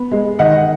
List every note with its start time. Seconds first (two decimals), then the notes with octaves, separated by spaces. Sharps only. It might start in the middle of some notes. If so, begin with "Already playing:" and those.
Already playing: B3
0.11 G#3
0.39 D#3 D#5 F#5